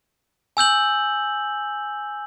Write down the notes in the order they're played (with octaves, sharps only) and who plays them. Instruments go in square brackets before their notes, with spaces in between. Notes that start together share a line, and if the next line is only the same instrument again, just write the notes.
[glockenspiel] G#5 E6 G6 F#7